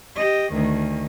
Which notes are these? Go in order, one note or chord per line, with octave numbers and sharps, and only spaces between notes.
G4 D#5
D2 D#3